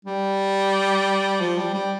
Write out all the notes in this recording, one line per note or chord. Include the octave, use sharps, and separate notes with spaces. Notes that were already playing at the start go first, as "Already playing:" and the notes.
G3
F3
G3
G3